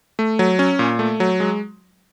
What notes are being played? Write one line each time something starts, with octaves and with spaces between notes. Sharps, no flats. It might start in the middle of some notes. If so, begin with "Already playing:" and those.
A3
F#3
C#4
A#2
A3
F#3
G#3